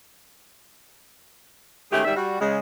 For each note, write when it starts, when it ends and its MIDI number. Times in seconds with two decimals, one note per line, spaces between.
1.92 2.01 51
1.92 2.01 56
1.92 2.01 57
1.92 2.01 61
1.92 2.01 67
1.92 2.01 68
2.04 2.15 44
2.04 2.15 51
2.04 2.15 55
2.04 2.15 76
2.16 2.37 55
2.16 2.37 66
2.40 2.58 49
2.40 2.58 56